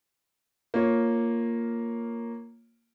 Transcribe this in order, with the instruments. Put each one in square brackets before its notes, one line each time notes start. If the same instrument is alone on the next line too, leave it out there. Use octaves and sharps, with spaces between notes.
[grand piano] A#3 F4 C#5